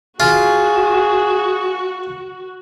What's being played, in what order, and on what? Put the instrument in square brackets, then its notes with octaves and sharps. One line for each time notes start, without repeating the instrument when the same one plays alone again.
[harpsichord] F4 [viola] F#4 [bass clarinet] G#4